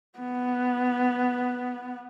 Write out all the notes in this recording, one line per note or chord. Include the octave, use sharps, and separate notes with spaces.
B3